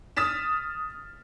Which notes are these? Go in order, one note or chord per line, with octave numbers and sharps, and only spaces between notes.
D#6 F6 A6 B6 E7